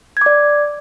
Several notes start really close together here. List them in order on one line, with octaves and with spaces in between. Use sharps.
G#6 D6 D5